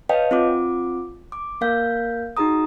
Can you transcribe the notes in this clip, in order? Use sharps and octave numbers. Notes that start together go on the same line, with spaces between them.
B4 C#5 D#5 F5 G5 A5
C4 F4 D6
D6
A#3 A#4 F5 G6
D#4 F#4 G#4 A#5 D#6